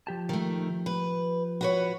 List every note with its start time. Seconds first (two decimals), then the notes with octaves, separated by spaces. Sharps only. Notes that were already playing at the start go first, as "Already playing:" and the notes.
0.07 F3 G4 A5
0.29 D#3 A3
0.86 B4
1.61 F#4 B4 C#5